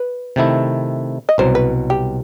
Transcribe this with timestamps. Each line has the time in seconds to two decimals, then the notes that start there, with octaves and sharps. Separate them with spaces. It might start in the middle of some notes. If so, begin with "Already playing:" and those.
Already playing: B4
0.36 C3 D#3 A3 E4
1.29 D#5
1.38 C2 B2 F#3 C5
1.55 B4
1.90 G4